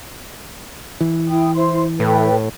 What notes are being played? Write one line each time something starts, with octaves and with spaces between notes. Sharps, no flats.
E3
E4 G5 D#6
E4 C5 C6
A2 A4 B4 G5